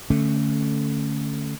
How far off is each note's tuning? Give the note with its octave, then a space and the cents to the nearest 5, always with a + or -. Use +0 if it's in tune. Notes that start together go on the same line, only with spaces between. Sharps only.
D3 +0 A3 +0 C#4 +0